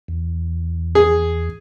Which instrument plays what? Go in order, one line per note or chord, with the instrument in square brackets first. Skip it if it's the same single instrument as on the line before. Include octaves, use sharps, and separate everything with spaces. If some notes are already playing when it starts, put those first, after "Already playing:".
[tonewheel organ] E2
[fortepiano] G#4